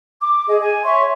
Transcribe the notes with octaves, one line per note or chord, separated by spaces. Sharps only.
D6
G#4 D#5
G#5
C#5 E5 C6 C#6